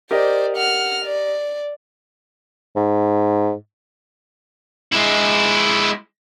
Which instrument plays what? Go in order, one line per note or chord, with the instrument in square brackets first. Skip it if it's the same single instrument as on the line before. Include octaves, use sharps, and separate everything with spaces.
[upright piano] G4 A#4 D#5 [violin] C5 D5
[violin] F#5 F6
D5
[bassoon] G#2
[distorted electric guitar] G#3 E4